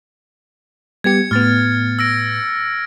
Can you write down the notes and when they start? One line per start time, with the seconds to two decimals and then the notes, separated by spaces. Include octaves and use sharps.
1.04 G3 B3 G4 G#6 C#7
1.31 A2 B3 F6 A6
1.99 E6 A#6 D7